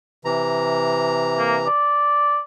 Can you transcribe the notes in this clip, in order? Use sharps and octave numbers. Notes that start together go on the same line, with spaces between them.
C3 E3 A#5
A#3
D5